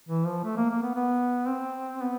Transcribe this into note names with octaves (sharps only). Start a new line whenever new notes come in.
E3
F3
A3
A#3
A#3
B3
B3
C4
B3